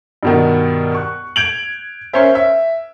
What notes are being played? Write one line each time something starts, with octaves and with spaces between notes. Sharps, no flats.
G2 B2 D#3
C#6 F#6
G6 G#6 D7 F7 F#7
C#4 A#4 C5 E5
E5